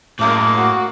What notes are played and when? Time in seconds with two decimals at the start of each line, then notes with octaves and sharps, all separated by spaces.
0.19 F#2 A2 G#3 A#3 D6
0.57 F#4